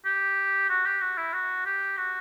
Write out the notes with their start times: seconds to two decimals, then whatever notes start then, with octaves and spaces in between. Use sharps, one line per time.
0.05 G4
0.69 F#4
0.85 G4
1.01 F#4
1.18 E4
1.33 F#4
1.66 G4
1.97 F#4